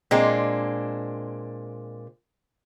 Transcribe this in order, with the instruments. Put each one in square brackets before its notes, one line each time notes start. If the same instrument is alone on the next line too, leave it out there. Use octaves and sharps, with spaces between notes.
[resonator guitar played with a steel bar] A#2 G#3 C4 D4